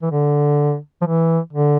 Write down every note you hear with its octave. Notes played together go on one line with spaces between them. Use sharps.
E3
D3
F3
E3
D3